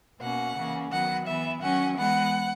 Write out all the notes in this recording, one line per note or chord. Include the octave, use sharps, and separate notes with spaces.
B2 A#3 C#4 F#5
C#3 E3 A#3 C#4
D#3 F#3 B3 F#5
E3 B3 E5
D#3 F#3 C#4 F#5
E3 G#3 B3 F#5